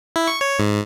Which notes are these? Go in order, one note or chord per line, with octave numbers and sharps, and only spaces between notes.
E4
C#6
C#5
G#2